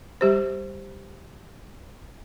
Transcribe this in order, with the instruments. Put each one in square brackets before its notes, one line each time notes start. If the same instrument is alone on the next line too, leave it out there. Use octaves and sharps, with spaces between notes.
[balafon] G3 G4 C5